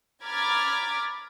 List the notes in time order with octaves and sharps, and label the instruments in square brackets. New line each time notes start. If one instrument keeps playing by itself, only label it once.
[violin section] A#5 B5 D6 F6 G#6 A6